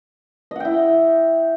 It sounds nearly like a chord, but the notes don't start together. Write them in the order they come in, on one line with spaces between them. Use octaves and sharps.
D#5 F#5 G5 E4